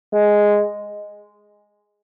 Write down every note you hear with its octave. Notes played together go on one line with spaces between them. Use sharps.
G#3